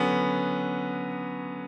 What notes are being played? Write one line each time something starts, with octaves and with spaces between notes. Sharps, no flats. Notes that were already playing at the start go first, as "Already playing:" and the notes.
Already playing: D3 F#3 B3 C#4